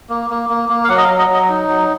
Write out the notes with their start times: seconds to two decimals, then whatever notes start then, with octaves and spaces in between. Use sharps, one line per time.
0.09 A#3
0.30 A#3
0.49 A#3
0.69 A#3
0.84 F5
0.89 F#3 F#5
0.98 D#5
1.04 F5
1.09 F#3
1.19 D#5
1.29 F#3 D#5
1.49 D#4
1.68 F#3